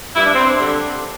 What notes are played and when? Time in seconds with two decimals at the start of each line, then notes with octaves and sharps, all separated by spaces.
0.14 G2 E4
0.24 D4
0.34 C4
0.43 D4
0.59 D3 G3